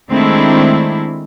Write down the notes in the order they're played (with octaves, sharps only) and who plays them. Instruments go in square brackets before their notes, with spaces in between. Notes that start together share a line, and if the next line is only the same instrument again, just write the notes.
[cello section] D#3 G#3 A3 C4 D4 E4